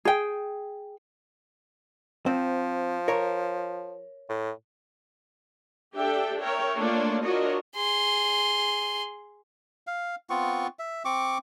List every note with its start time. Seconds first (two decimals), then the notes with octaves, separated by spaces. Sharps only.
0.05 G#4 G5
2.26 F3 C4
3.08 A#4 C#5
4.29 A2
5.94 D4 G4 A4 E5 G5
6.41 A#4 C#5 E5 G5
6.77 A3 A#3 D4 F4 C#5 D5
7.23 D4 F4 F#4 A#4 C#5 D#5
7.76 G#4 C6
9.87 F5
10.30 B3 C4 F4 C#6
10.79 E5
11.05 C4 C#6 D6